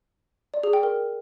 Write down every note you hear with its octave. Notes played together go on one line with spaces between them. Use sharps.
D5
G#4
G5
A#4